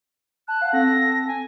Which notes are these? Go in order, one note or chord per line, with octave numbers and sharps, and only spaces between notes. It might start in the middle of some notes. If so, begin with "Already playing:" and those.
A5 F#6
F5 F#5
C4 A4 A#6
G#5